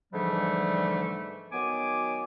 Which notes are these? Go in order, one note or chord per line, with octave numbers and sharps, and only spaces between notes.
G#2 D3 E3 F3 G3 A3
D#3 F#3 B3 G#5 D6